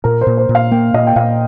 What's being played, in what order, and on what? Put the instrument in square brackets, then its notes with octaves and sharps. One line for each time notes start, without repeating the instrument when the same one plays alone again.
[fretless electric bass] A#2 [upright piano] A#4
[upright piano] C5
[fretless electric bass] A#2
[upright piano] C5
[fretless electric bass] A#2
[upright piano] F5
[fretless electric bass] A#3 [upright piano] G5
[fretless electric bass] A#2 [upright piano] D#5
[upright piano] G5
[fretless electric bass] A#2 [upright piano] F5